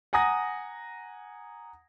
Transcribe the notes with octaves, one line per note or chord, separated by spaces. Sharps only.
F#5 G#5 A#5 D#6 A#6